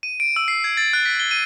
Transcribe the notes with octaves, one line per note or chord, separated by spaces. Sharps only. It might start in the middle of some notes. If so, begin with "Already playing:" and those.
D#7
D7
E6
C7
G#6
A6
F#6
B6
G7
D#7